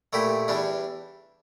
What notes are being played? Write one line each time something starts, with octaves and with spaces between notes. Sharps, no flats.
A#2 A3 E4 G4
E2 E3 G3 D4